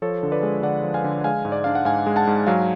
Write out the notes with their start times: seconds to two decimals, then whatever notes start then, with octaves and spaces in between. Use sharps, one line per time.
0.02 F3 A4 C#5
0.23 D3
0.32 B4 D5
0.43 G#3
0.63 D3 D5 F#5
0.83 F3
0.94 F5 G#5
1.04 D3
1.24 G#3 F5 G#5
1.45 G#2
1.52 D5
1.64 D4 F5
1.75 F#5
1.85 G#2 F5 G#5
2.06 G#3
2.16 F#5 A5
2.27 G#2
2.47 F#3 F5 G#5